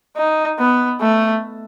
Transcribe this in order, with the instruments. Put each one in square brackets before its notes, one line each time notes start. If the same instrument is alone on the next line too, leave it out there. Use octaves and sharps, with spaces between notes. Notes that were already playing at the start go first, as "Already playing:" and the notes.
[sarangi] D#4
B3
A3